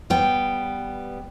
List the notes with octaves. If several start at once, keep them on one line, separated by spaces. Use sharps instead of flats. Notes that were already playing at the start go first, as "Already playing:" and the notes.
G3 B3 G5